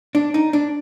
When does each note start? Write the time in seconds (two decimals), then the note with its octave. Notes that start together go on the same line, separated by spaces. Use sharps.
0.15 D4
0.34 D#4
0.53 D4